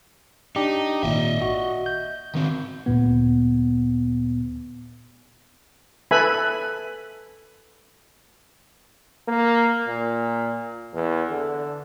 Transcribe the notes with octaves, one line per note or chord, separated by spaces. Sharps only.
D4 D#4 G4
G#1 A#2 D#5 E5
F#4
G6
D#3 C4
D2 A#2 B3
A4 B4 E5 G#5 B5
A#3
A#2
E2
D3